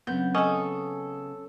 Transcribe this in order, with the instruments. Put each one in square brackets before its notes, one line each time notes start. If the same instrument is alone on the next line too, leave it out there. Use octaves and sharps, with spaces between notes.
[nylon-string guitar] C#3 B3 [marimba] F#3 C4 [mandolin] G6
[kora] C#4 [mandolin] A4 D#6 [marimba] D#5